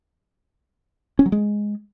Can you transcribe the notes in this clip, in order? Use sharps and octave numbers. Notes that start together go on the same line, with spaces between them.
C#4
F#3
G#3